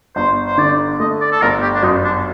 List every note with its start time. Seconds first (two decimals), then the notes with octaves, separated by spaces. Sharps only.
0.16 G1 C5
0.47 C5
0.58 D3 D5
1.00 A3 D#5
1.21 D5
1.32 A4
1.41 G1 A#4
1.62 G4
1.74 D4
1.83 F#2 D#4
2.04 D4